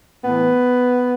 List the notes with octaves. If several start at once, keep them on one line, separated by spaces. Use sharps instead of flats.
A2 E3 B3